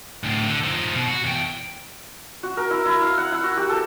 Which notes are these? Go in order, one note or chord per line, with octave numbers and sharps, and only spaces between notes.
D2 A2
D3
F3 D#4
B2
F#4
E2 G5
F#4
A#4
E4
E4
F5
F#5
E4
F#4
G4
A4